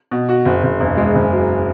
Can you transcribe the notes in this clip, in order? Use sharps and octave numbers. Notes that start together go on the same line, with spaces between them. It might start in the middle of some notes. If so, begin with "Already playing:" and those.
B2
F#4
F#1
F#1
E1
G#3
F#1
F#3